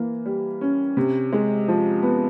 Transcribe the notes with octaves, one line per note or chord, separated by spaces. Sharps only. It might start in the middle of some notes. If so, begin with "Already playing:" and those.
Already playing: E3 A#3
G3
C#4
C3
G#3
F3
B3